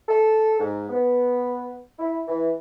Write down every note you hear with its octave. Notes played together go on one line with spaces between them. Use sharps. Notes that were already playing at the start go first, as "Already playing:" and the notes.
A4
G#2
B3
E4
E3